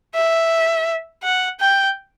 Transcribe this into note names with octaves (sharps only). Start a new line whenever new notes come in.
E5
F#5
G5